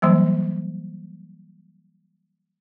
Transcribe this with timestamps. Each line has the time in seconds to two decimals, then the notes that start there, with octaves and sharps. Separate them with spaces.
0.02 E3 F#3 G3 A#3